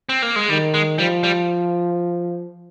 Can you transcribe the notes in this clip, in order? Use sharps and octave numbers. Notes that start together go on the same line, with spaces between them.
C4
A#3
G#3
D#3 G3
G#3
F3 G3
G3